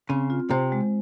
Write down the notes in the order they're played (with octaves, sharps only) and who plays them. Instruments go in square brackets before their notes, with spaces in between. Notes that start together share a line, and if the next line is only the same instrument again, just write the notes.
[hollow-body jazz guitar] C#3 [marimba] C4
[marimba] F4
[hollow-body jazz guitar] C3 [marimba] C5
[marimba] G#3